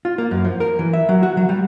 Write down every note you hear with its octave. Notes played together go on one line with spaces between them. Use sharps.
F4
A#3
F#2
F3
A#4
E3
E5
F#3
F#4
F#3
G3